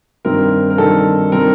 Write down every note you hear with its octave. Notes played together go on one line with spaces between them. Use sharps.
G2 D#3 G3 C4 A#4
A#4
G2 D#3 G3 C4 A4
D#3 G3 C4 A#4